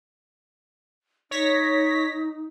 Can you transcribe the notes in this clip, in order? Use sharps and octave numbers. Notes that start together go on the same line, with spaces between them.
D#4 C#5 A#6 B6